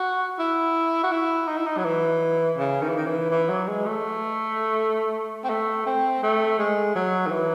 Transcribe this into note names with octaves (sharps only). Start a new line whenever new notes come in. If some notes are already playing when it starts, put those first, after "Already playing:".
Already playing: F#4
E4
F#4
E4
D#4
E4
D#4
F#3
E3
C#3
D#3
E3
D#3
E3
E3
F#3
G#3
A3
C4
A3
C4
A3
G#3
F#3
D#3
E3